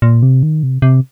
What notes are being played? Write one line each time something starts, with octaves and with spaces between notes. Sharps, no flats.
A#2
C3
D#3
C3
C3